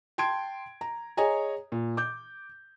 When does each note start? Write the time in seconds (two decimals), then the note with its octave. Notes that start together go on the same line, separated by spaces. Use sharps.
0.18 G5 A5 C6 G#6 D7
0.81 A#5
1.17 G#4 C#5 D#5 G#5 A#5
1.72 A#2
1.97 D6 G6